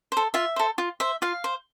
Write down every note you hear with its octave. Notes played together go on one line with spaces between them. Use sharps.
A4 C5
F4 E5
A4 C5
F4
C5 E5
F4 F5
C5